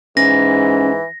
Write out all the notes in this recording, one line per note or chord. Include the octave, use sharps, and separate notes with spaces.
G#2 E3 C#4 A#6